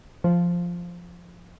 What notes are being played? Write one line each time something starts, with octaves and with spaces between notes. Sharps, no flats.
F3